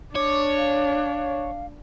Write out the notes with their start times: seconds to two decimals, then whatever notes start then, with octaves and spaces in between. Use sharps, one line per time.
0.15 D4 C#5 D6
0.58 F5